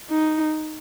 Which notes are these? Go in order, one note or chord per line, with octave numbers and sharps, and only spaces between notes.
D#4